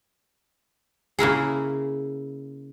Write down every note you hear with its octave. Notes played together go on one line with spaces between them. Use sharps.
C#3 A#3 E4 G#4